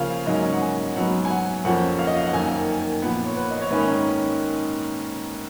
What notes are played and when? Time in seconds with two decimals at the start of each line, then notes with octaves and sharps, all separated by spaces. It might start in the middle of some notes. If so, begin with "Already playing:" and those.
Already playing: C#3 F3 A#3 C#4 F5
0.26 G#2 F#3 A#3 C#4 D#5
0.53 F#5
0.62 G#5
0.95 G#2 F#3 B3 F#5
1.25 G#5
1.30 F#5
1.65 F2 F3 A#3 C#4 F#5
1.99 F5
2.07 D#5
2.17 F5
2.25 F#5
2.33 F#2 D#3 A#3 G#5
3.02 A#2 F3 B3 F#5
3.26 C#5
3.36 B4
3.51 D#5
3.61 C#5
3.71 G#2 D#3 A#3 C#4 B4